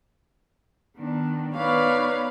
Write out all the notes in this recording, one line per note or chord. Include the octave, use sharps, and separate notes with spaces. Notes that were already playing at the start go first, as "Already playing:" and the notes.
D#3 B3 D4
B3 D#4 B4 C#5 D5 F5